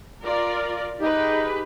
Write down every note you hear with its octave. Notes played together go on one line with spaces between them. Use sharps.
F4 A#4 D5
D#4 G4 G#4 B4